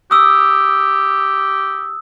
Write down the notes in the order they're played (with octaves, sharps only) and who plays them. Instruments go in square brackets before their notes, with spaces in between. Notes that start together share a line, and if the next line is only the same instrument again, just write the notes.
[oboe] G4 [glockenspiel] D#6 E6